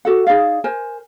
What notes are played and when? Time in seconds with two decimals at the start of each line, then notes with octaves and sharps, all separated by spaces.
0.05 F#4 A4 F#5
0.27 D#4 G#4 D5 F5
0.64 A#4 C5 G#5